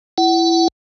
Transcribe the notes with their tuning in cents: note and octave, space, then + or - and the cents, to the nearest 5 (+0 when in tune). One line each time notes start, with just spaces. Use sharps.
E4 +20 F#5 +25